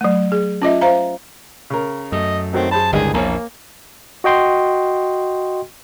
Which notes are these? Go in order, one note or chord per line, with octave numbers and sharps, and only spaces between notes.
F#3 A3
G#4
C#4 F4 D#5 E5
C5 F5 A#5
C#3 A#4
F#2 A3 D#5
D#3 F#3 A3 C4
G#4 C5 A5 B5
G1 C#2 D#3 G#3 D4 G#4
A#1 E2 A#3 C#5 G#5 A#5
F#4 D#5 G5 C6